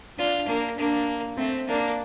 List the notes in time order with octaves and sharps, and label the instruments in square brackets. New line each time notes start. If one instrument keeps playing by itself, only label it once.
[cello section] D4 [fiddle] F4
[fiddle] A#3 [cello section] D4
[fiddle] A#3 [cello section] D4
[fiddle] A3 [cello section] C4
[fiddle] A#3 [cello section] D4